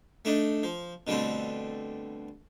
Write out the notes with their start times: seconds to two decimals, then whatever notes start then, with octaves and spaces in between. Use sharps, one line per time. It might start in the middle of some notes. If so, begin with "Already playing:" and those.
0.25 A3 D4 D#4
0.63 F3
1.07 B2 D3 G3 A3 C4